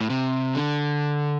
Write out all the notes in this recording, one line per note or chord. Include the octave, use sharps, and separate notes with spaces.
A2
C3
D3